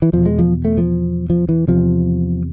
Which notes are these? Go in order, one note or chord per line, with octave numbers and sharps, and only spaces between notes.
E3
E2 B2 F3
G#3
F3
A3
F3
F3
E3
E2 C3 F3